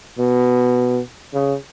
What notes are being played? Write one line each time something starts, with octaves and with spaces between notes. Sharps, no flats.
B2
C#3